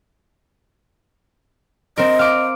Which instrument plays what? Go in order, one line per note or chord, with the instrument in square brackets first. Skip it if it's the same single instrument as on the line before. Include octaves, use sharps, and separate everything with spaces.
[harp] C4 A#4 [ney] D#5
[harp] F5 D6